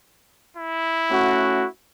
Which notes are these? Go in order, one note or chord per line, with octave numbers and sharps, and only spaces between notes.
E4
A3 C#4 F#4